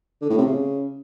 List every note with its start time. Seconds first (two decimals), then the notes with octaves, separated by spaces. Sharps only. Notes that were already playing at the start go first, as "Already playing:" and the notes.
0.21 D3
0.30 A2
0.38 C3
0.46 C#3